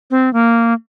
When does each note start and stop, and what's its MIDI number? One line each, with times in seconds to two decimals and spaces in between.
0.11 0.32 60
0.33 0.73 58